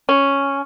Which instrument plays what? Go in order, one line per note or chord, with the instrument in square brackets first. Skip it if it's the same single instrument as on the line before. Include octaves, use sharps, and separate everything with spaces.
[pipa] C#4